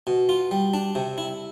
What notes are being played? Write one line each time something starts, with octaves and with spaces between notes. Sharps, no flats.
B2
F4
G3
D4
C3
E4